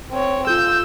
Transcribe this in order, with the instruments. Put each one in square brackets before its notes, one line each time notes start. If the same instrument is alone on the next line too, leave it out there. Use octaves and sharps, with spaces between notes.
[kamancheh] C4 C#5
[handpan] F4 A4 [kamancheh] E6 [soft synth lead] G6